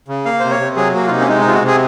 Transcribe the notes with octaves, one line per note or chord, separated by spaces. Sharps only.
C#3
A#3 F5
C3 C5
C#5
C3
F#3 G#4
A#3 F#4
F4
C3 D#4
C#4
G#3 D#4
D#4
C3 F4
F#4
C3 G#4